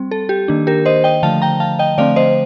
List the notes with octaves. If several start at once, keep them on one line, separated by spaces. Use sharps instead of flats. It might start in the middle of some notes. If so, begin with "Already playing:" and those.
Already playing: G3 C4
A4
G4
D#3 A#3 D4
G4 A#4
C5 D#5
D#5 G5
D3 F3 A3 F5 A5
G5 A#5
F5 A5
D#5 G5
D3 F3 A3 C4 D5 F5
C5 D#5